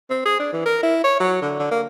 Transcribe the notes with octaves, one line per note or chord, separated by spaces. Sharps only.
C4
G#4
D4
E3
A#4
E4
C#5
F#3
D3
D3
A#3